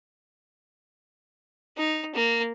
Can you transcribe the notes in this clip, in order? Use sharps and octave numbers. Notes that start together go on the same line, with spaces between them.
D#4
A#3